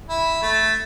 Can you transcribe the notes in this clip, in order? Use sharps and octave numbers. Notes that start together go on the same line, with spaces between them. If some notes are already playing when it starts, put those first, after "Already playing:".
E4
A3